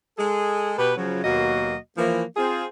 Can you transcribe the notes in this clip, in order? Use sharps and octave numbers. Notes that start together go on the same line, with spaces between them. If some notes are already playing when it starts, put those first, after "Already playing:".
G#3 G#4 A4
B2 B3 G4 B4
C#3 F3 F#3
D#2 B2 F#3 A#3 F#4 D#5
E3 F3 A#3
C4 F4 G#4